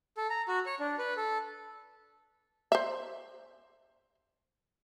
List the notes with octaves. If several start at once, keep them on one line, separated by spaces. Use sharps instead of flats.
A4
A#5
F#4
C#5
D4
B4
A4
C5 E5